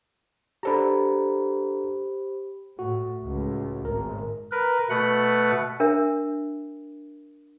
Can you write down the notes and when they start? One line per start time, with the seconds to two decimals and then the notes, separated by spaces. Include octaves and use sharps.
0.63 D4 G4 A4 C5 A#5 B5
2.79 A2 F#4
3.22 C#2 A2
3.85 G#1 A#4
4.52 A#4 B4
4.90 B2 A3 B4 F#5 F#6
5.80 D4 A#4 E5